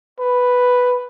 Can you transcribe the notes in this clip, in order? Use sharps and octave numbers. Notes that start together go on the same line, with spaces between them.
B4